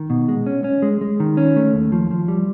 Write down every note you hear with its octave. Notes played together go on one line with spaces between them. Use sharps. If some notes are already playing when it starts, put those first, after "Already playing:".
Already playing: D#3
B2
G#3
C#4
C#4
G#3
G#3
D#3
C#4
A3
D#2
F3
F3
G3